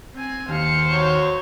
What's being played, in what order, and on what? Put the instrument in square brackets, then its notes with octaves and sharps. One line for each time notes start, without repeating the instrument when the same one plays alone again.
[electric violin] C4 G#5
[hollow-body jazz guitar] D#2 [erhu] C5 [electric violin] F5 C#7
[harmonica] F#3 C#5